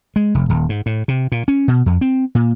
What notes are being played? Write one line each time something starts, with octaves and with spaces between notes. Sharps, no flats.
G#3
F1
D#1
G#2
A2
C3
A#2
C#4
B2
F2
C4
A#2